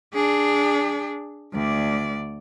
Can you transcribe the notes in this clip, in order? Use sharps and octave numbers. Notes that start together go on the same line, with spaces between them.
D4 G#4
D2 D5